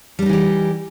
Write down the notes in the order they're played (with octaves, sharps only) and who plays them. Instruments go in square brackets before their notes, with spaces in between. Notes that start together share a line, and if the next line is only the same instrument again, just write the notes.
[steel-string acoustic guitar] G3
D4
D#4
E3
G4